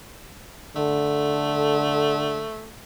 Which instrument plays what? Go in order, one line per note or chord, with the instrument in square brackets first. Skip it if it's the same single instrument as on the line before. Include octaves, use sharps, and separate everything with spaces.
[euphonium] D3 [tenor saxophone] A3